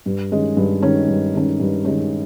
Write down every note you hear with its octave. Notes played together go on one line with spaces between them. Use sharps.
G2
D#3 G#3 C#4
G2
D#3 G#3 C#4
G2
D#3 G#3 C#4
G2
D#3 G#3 C#4